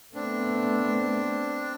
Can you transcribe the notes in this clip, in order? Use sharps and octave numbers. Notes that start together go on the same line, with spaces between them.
A3 B3 C4 D4